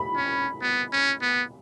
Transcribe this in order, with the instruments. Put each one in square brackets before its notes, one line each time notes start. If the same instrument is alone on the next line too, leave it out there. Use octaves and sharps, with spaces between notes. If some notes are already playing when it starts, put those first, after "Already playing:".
Already playing: [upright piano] B5
[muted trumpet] C#4
B3
C#4
B3